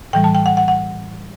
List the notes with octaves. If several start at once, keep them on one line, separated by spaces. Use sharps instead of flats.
A2 E3 G3 G5
A5
G5
F#5
F#5
F#5